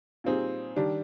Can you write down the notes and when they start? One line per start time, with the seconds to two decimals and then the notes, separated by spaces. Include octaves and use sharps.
0.24 A#2 G3 C4 D#4 G#4
0.76 D#3 G3 D4